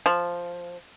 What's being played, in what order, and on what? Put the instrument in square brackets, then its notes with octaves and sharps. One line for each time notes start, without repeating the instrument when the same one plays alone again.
[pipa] F3